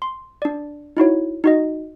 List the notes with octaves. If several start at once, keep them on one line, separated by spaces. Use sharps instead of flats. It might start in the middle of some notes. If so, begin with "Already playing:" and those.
C6
D4 D5
D#4 E4 F#4 C#5
D#4 F#4 D#5